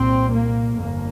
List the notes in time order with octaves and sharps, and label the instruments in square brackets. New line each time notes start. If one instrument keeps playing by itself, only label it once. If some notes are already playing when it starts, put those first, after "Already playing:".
Already playing: [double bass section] C2 A#2 C4
A#3
G1 F2 A#3